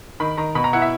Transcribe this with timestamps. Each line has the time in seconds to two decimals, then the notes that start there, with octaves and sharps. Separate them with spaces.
0.20 D#3 B5
0.37 D#3 A#5
0.55 B2 B5
0.64 A#5
0.73 E4 F#5
0.82 E5